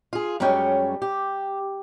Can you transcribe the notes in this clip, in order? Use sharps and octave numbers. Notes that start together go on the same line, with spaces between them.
F4 G#4
F#2 G3 G#3 C#4 C#5 G5
G4